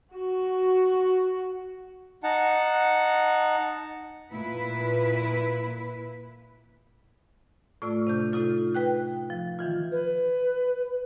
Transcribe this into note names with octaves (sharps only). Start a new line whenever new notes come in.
F#4
D#4 F#5 A5
A#2 E4 B4
A2 A3 F4 D5 E6
C3 D4 G6
A2 C3 D#4 F4 A4
B4 G5 F#6
F3
D#3 E3 F4
B4